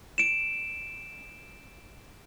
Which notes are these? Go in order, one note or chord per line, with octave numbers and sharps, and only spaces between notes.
D7 E7